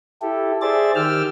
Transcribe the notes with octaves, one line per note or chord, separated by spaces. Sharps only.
E4 G4 A4
G#4 C5 D5 E5 A6
D#3 G4 G5 E6 F6